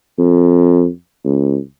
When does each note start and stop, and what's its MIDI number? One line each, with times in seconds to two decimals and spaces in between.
0.18 0.86 41
1.25 1.58 37